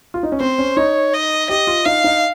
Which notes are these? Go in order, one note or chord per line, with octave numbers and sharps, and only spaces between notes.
F4
D#4
C#4
C4 C5
C#4
D#4 C#5
D#5
G4 D#5
F4
D#4 F5
D#4